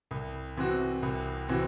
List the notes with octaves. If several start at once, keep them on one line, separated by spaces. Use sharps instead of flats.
C2
C3 E3 C4 F#4
C2
C3 E3 C4 F#4